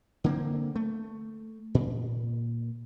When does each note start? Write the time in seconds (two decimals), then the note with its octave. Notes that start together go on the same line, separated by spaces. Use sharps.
0.24 D3 A#3 C4
0.76 A3
1.75 A#2